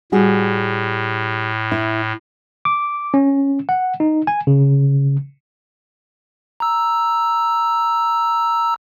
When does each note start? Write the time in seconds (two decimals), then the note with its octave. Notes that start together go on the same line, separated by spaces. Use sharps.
0.12 A2 G3 F#4 G#4
1.72 E4
2.65 D6
3.14 C#4
3.69 F#5
4.00 D#4
4.27 G#5
4.47 C#3
6.60 A#5 E6